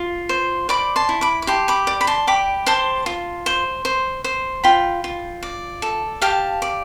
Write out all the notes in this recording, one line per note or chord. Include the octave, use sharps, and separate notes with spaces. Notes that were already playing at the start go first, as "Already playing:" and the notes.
Already playing: F4
C5
D5 B5 D6
A5 C6
E4
B5 D6
D6
G4 A5 C6
B5 D6
D5
B5
A5 C6
G4 B5 D6
C5 A5 C6
F4
C5
C5
C5
F4 G5 B5
F4
D5
A4
G4 F5 A5
D5